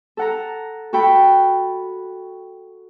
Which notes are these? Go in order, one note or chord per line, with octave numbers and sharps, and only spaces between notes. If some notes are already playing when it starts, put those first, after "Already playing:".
A4 F#5 A#5
F#4 A4 G5 B5